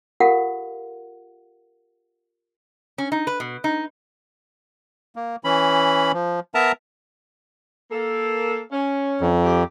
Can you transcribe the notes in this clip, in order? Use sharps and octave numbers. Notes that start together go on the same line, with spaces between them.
F4 G4 A4 A#4 F5 F#5
C#4
D#4
B4
B2
D#4
A#3
E3 C#4 B5
F3
B3 A#4 E5 A5 A#5
A#3 A4
C#4
F2
G4